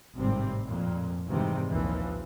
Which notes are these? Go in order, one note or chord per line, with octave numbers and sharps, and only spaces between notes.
G#1 A2 C3 G3 C4
F2 A#2
G#2 C3 D#3 E3 G3 A3
A#1 D#2 E3 F3